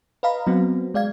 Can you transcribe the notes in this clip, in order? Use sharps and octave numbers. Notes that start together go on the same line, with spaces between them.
B4 D#5 F5 A#5 B5
F#3 B3 C4
G#3 D5 F5 G#6